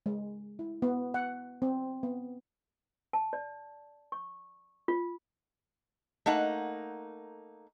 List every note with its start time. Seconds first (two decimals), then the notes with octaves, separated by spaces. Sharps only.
0.06 G#3
0.59 E4
0.82 B3
1.14 F#5
1.62 C4
2.03 B3
3.13 A5
3.33 D5
4.12 C#6
4.88 F4
6.26 A3 A#3 D#4 F#5